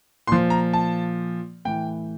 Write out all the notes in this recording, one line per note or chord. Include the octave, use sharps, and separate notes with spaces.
A#2 F3 C6
A#5
A5
A2 E3 G5